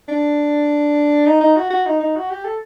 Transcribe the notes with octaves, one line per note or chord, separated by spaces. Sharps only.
D4
D#4
D#4
F#4
F#4
D#4
D#4
F#4
G4
A4